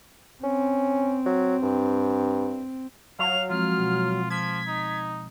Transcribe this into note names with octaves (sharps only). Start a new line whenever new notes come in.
C4 C#4
F#3
G2
F#3 F5 F7
F3 G#3 C4 F4 F6
B2
F3 F6 G#6 B6
D#4